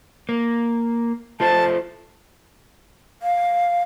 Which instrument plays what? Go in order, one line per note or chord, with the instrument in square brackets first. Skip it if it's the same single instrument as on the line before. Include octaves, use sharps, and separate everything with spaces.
[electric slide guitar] A#3
[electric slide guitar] A3 F4 C5 [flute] A5
[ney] F5